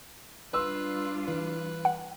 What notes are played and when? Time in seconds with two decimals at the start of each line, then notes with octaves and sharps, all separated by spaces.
0.53 G3 D4 F4 B4 C6 E6
1.28 E3 B4
1.85 F#5